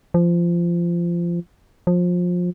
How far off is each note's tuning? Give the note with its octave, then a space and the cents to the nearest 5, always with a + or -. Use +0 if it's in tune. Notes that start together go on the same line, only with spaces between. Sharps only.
F3 -20
F3 +25